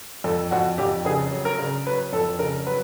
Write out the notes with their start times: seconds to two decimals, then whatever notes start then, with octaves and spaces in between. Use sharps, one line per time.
0.24 F2 A4
0.51 F2 F#4
0.78 F2 G4
1.05 C#3 G#4
1.32 F#3
1.45 A#4
1.59 C#3
1.87 F#3 B4
2.13 F2 A4
2.39 C#3 A#4
2.66 F#3 B4